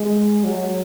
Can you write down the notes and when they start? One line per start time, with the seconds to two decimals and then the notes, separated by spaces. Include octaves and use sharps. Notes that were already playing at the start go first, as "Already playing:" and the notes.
Already playing: G#3
0.44 F#3